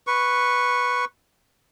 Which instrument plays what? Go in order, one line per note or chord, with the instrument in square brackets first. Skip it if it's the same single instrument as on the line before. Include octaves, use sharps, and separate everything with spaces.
[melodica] B4 C#6